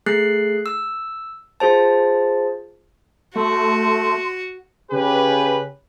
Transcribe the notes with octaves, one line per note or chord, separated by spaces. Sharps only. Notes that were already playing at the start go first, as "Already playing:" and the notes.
A3 G#4 F#6 C7
E6
F4 G#4 C5 A5
A3 F#4 C6
C#3 C#4 G4 B4